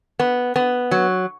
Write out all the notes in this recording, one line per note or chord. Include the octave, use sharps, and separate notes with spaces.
B3
B3
F#3